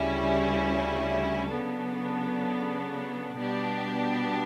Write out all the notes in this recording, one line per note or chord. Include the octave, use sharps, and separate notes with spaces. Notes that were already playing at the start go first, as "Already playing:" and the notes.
Already playing: D2 C#3 G3 C#4 E4
C#3 F#3 B3 D4 A4
B2 G3 B3 D4 G4